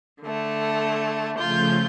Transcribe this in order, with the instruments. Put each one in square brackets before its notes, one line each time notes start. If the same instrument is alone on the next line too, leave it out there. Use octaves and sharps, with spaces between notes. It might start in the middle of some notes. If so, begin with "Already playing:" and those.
[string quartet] D3 A3
[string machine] C#3 F3 A3 [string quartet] F4 G6